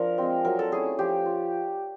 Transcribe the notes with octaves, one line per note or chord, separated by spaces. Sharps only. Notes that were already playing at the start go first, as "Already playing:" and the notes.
Already playing: F3 D4 A#4
G#3 C4
F#3 A#4
A4
A3 C#4 E4 G#4
F3 G4
F4